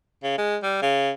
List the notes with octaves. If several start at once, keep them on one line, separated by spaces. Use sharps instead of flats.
C#3
G#3
G3
C#3